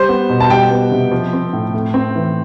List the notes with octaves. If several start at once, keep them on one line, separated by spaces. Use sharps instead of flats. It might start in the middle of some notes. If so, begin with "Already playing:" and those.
Already playing: G3 C5
B3
B2
A5
G3 G5
B3
C3
F3
C4
A2
A3
C4
E3